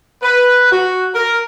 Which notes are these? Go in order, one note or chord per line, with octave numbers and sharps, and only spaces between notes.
B4
F#4
A#4